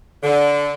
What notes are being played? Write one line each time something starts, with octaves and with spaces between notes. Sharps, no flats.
D3